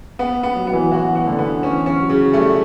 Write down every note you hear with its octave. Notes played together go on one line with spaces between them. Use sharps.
B3
B3
F#3
B3
E3
E3 F#4
B3
D3
B3
E3 C#4
C#4
F#3
C#3
G3 A3